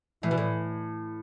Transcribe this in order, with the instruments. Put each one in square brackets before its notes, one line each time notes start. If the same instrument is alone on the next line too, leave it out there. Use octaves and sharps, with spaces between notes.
[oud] A2 [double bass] E3
[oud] B2
A2